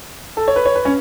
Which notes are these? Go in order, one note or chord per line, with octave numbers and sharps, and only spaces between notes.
A4
C#5
B4
C#5
B4
C#4